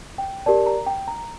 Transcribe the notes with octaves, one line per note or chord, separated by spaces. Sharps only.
G5
G4 A#4 D5 A5
A#5
G5
A#5